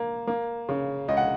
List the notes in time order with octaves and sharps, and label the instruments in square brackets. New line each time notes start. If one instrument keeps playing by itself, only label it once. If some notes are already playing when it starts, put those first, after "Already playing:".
Already playing: [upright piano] A#3
A#3
C#3
C#2 D#5
F#5